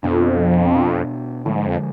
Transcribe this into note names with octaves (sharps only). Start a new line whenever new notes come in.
F2 B2 B3 D4
B2 B3 D4
A2 D3 F3 G#3
G#2
F2